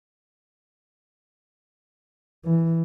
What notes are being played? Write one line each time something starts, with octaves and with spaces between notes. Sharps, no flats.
E3